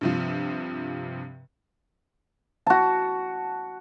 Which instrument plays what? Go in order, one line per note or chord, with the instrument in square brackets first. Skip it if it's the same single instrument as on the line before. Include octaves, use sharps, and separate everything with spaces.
[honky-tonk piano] G2 C3 F3
[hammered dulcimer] F#4 A5